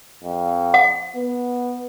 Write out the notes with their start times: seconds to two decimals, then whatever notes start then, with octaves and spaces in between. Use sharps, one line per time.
0.24 F2
0.74 F#5
1.16 B3